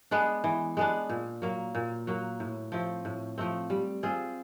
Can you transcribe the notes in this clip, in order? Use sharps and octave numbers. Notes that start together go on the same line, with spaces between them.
G#3 B3 D4
E3
G#3 B3 D4
A#2
F#3 A#3
A#2
F#3 A#3
A2
F3 A3 C4
A2
F3 A3 C4
G3
C4 F4 G#4